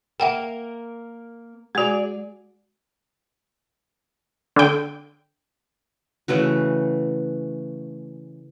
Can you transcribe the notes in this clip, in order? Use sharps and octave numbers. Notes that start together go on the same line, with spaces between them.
A#3 A#4 E5 F#5 G5
G#3 F#4 G#4 D5
D3 G5
C#3 E3 A3 F#4